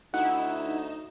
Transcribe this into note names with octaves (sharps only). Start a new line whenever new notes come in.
D2 D#4 E4 F#5 E7